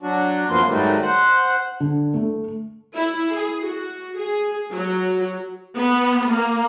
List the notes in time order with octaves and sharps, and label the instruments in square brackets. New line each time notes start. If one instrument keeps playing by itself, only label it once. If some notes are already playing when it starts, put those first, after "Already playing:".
[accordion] F#3 D4 F#4
F#2 F3 A#3 B3 C6
G#2 D#3 F#3 G3 A3
C5 F#5
[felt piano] D3
A3
[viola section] E4
G#4
F#4
G#4
F#3
B3
A#3